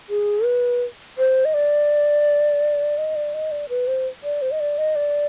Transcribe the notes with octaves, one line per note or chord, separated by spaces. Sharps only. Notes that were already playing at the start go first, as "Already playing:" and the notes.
G#4
B4
C5
D#5
D5
D#5
D5
D#5
D5
B4
C5
D5
C5
D#5
D5
D#5
D5